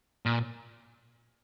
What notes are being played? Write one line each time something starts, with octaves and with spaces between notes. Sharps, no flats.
A#2